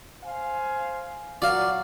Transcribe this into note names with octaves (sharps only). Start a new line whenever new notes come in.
C5 F5 G#5
A#2 F#3 D5 F5